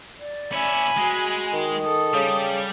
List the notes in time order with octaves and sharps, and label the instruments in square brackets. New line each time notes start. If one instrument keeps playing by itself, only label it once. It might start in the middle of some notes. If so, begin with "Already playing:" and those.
[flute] D5
[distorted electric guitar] C#4 E4 [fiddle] G#5 B5
[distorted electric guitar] G#3 [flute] F#4
[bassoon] D#3
[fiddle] A4 [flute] D#6
[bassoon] C#3 [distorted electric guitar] G3 G4